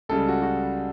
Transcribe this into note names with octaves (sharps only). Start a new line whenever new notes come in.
C#2 C#3 G3 A4
F#4
F#4